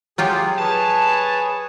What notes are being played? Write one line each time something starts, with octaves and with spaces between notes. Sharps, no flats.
F#3 F4 G4 G#4
G#4 B4 C#5 A5